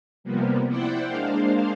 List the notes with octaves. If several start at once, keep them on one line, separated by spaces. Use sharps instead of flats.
C3 F3 G3 A#3 B3
E4 C5 D5 F#5 G5
G#3 A#3 D4 C5 F5